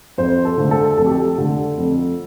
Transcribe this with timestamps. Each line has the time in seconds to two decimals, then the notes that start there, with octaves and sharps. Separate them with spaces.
0.18 F2 C5
0.45 A4
0.57 D3 A3
0.71 A4
0.98 F2 A4
1.06 G4
1.15 A4
1.38 D3 A3
1.78 F2